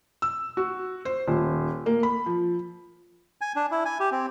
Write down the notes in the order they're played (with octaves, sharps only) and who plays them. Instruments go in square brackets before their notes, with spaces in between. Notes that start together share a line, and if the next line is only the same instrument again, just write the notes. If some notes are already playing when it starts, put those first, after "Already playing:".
[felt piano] E6
F#4
C5
D#1
A#3
B5
F3
[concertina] G#5
D4
E4
G#5
G4
C4